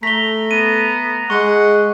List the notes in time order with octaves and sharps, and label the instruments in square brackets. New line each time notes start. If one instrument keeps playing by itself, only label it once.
[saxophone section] A3 [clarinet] A#5 [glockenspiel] B6 G7
[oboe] B3 [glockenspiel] D#7
[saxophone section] G#3 [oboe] F#5 [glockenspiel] C#6